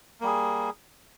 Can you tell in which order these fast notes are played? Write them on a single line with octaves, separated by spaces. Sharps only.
A#3 G3 G#4